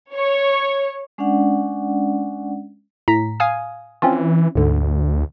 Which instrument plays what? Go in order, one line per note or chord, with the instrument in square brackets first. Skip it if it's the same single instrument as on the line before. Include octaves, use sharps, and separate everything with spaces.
[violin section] C#5
[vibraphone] G#3 C#4 D4 D5 F#5
[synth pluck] A2 A#5 B6
F5 G#5 D#6
[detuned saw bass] E3 [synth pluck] C4 C#4 F4
[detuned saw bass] D2 [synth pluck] G#2 D3